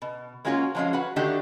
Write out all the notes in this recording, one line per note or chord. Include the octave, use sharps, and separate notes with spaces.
B2
G#3 A#3 C#4 F4 F#4 C#5
F3 F#3 G#3 A#3 C#4 F5
F#4 B4 F#5
D3 D#3 A3 D4 F#4 G4